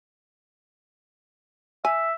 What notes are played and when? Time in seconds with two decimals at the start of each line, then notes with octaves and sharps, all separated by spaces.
1.85 E5 G#5